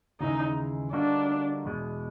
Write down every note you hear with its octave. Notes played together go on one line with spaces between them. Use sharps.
D#2 C#3 E3 G#3 D#4
D3 G3 A#3 D4 D#4 F#4
E2 B2 G#3